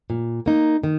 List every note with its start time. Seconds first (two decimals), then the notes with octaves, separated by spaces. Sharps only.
0.10 A#2
0.46 A#3 D#4
0.84 D#3